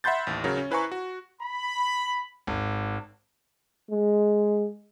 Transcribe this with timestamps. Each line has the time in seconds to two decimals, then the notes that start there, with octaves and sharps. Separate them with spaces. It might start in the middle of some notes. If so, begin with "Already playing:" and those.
0.04 E5 F#5 B5 C6 G6 A6
0.27 A1 D#2
0.44 C#3 F#3 A#4
0.57 C#4
0.71 E4 B4 C5 G#5 A#5 C#6
0.92 F#4
1.41 B5
2.47 G#1
3.90 G#3